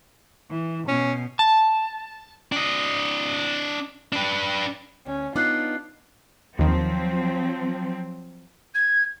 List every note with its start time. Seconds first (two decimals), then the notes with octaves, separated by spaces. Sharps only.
0.51 E3
0.88 B2 C#4
1.39 A5
2.52 D4 D#5
4.13 D4 B4
5.06 D2 C#4
5.36 B3 D4 D#4 F4 D6 F#6 C7
6.59 D#2 D#3 F3 F#3 C4
8.74 G#6